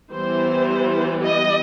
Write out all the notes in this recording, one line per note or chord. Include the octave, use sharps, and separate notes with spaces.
E3 G3 B3 C5
D#5